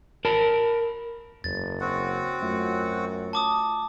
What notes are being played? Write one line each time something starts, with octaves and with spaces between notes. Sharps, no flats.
A#4 A5 B5
F#1 E2 C#3 A6
C4 F#4 F#5
F#2 A3 F4 E5
A5 D6 D#6